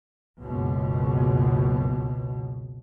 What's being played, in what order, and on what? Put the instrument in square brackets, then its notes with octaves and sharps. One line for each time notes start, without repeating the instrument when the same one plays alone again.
[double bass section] F#1 C#2 F#2 B2